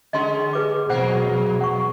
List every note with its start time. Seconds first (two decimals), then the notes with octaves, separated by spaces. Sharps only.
0.13 D3 G#3 C#4 D#5 C6
0.53 G#4 B4 D6
0.89 E2 B2 F#3 G#3 A#3 C5 F#5
1.61 F#5 C#6